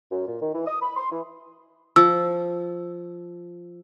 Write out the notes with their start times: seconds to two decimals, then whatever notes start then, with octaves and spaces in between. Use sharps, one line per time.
0.11 F#2
0.27 A#2
0.41 D#3
0.53 E3
0.66 D#6
0.82 B5
0.97 C6
1.11 E3
1.96 F3 E6